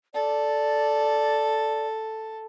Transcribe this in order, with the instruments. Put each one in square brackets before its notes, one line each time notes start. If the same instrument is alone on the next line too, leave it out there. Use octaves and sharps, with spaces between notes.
[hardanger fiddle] A4 [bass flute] D5